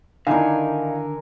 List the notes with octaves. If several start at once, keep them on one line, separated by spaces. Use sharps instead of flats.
D3 D#3 D#4 E4 A#4 D5 F5 G#5